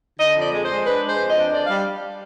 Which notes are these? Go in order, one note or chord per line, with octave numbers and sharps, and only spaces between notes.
D3 D#5
F2
D5
G#3
G#3 C5
D4 B4
G#3
C5
F2
D#5
D4
D4 D5
G3 F5